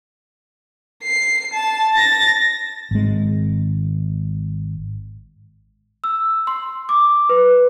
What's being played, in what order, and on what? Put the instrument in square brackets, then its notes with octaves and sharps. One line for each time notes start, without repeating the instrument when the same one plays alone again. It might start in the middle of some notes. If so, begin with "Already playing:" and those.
[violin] C7
A5
A6 A#6
[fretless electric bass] G#1 G#3
[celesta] E6
C6
D6
B4